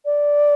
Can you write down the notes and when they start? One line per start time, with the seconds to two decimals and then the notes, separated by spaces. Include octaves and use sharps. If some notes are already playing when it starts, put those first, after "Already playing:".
0.05 D5